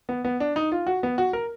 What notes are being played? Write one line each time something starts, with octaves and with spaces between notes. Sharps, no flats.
B3
B3
D4
D#4
F4
F#4
B3
F#4
A#4